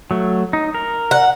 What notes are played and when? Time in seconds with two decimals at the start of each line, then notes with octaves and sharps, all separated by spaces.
0.11 F#3 A3
0.53 D#4
0.75 A#4
1.11 F#5